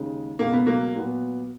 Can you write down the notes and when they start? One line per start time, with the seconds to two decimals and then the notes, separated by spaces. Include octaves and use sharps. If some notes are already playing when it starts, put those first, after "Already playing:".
Already playing: D#2 C#3 G#3 D#4
0.39 C#2 B2 G#3 A#3
0.53 B3
0.66 F#3 A#3
0.95 A#2 F#3 B3